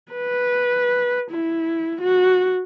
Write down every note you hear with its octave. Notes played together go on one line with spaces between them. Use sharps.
B4
E4
F#4